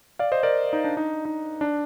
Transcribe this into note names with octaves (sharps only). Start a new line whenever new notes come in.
D5 F5
C5 D#5
A#4 D5
D#4
D4
D#4
D#4
D4